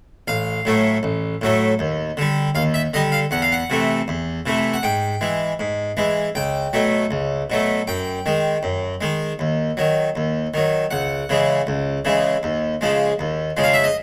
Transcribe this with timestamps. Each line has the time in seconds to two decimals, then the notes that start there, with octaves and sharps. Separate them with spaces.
0.28 A1 F5
0.65 A2 F#3 A3
1.03 A1
1.41 A2 F#3 A3
1.79 D#2
2.17 D3 G3
2.55 D#2 F5
2.74 E5
2.94 D3 G3 D#5
3.12 F5
3.31 E2 F#5
3.42 F5
3.52 F#5
3.70 C3 E3 A3
4.08 E2
4.46 C3 E3 A3
4.74 F#5
4.83 G#2 G5
5.21 E3 G#3
5.60 G#2
5.97 E3 G#3
6.35 C#2 G5
6.73 B2 F#3 A3
7.11 C#2
7.50 B2 F#3 A3
7.87 F#2 G5
8.26 D#3 G#3
8.63 F#2
9.01 D#3 G#3
9.39 D#2
9.77 D#3 F#3
10.16 D#2
10.54 D#3 F#3
10.91 C#2 F#5
11.29 C#3 E3 G#3
11.67 C#2
12.05 C#3 E3 G#3
12.43 D#2
12.81 C#3 F3 G#3
13.19 D#2
13.57 C#3 F3 G#3
13.64 F5
13.74 E5
13.84 D#5